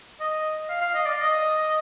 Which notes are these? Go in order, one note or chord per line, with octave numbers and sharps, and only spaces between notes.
D#5
F5
F5
D#5
D5
D#5